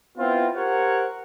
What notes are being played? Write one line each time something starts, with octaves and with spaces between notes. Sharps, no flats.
B3 C4 E4 F4
G4 A#4 C5 C#5 F#5